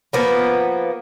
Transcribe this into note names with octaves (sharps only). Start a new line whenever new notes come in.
F3 A#3 B3